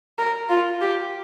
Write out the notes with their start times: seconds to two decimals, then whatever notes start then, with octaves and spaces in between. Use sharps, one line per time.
0.18 A#4
0.49 F4
0.81 G4